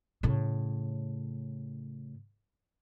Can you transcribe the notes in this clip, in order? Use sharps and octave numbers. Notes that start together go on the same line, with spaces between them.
A2 C#3